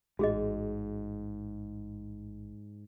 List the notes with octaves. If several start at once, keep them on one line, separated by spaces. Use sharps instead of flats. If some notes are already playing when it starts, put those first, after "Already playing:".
A1 G#2 F#4 G#4 D#5